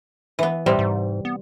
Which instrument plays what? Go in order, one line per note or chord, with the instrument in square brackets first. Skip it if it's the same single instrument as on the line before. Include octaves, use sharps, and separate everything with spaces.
[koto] E3 B3
[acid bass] A2 [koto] C3 G3 C4
[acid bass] G#2
B3